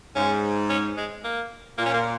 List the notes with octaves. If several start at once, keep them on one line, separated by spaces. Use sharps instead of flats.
G#2 C#4
C#4
G#3
A#3
A#2 A#3
C#4
A#3